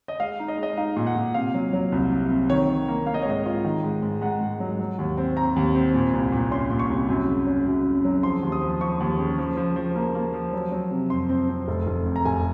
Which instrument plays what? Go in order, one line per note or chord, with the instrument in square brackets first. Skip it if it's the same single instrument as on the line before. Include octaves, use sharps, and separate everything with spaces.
[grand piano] D#5
G#3 F5
D#4
D#5
G#3
D#5
D#4 F5
A#2
F#5
A#2
C3 F5
F#3
F#3
C2
C3
C3
D#3 C#5
D#3
A#3
A#3 F5
D#5
C#5
G#2 D#5
F4
D#3
G#2
G#2
G#2 F#5
G#2
F#3
F#3
D#2
C4
C4 A#5
D#2
C4
A#2
C2
A#2
C#4 C6
A#2
C#6
C2
F#2
C#3
C#4
F#2
C#3
F#3
F3 C6
D#2
D#6
F3
F3 C#6
D#2
C#3
F3
F3
F3
A#3
A#3
F3
F#3
F#3
C3
F2 C6
C4
C4
F1
F1
F2
A#5
F1 G#5